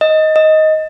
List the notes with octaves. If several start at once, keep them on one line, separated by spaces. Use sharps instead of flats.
D#5
D#5